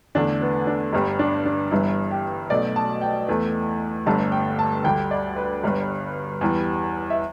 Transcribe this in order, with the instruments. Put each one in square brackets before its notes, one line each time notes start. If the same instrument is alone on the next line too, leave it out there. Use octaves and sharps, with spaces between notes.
[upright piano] E2 D3 A3 D4
B3
D4
G1 G2 G3
D4
D4
G1 G2 E3 E4
G4
B1 B2 A3 D5
A5
G5
E2 E3 A3
G1 G2 D3 A3 A5
G5
A5
D2 D3 G3 G5
D5
B4
G1 G2 G3
E2 E3 G3
E5